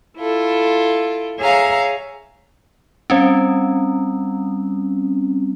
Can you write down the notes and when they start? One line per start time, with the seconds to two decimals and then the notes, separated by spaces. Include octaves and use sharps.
0.18 E4 F4 A4
1.39 G#4 C#5 E5 F5 A#5
3.10 G3 C4 C#4